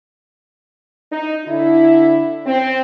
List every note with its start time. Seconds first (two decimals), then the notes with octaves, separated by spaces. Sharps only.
1.11 D#4
1.45 D3 E4
2.46 C4